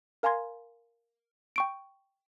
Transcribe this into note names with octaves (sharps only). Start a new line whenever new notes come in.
A#4 F5 G#5 A#5 C6 G#6
G5 C#6 D7